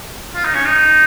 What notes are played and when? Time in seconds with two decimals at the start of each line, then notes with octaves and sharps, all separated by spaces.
0.35 F4
0.45 D#4
0.54 C#4
0.65 D#4